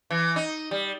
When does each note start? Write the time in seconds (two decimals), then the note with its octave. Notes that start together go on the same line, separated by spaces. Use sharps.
0.11 E3
0.36 D#4
0.71 G3